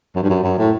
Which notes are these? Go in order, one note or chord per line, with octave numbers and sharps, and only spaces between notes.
F#2
G2
F#2
F#2
A2